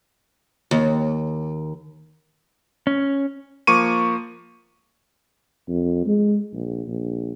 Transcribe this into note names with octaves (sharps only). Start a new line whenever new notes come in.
D#2
C#4
F3 A#3 C#6 D6 D#7
F2
G#3
A#1
A#1